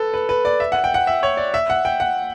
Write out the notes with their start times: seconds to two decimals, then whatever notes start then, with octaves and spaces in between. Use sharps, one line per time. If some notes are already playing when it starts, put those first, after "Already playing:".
Already playing: A4 B4
0.14 B4
0.29 B4
0.45 D5
0.60 E5
0.72 F#5
0.84 G5
0.94 F#5
1.07 E5
1.23 C#5
1.37 D5
1.54 E5
1.70 F#5
1.85 G5
2.00 F#5